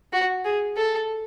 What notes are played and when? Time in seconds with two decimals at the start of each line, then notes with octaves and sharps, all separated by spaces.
0.13 F#4
0.45 G#4
0.77 A4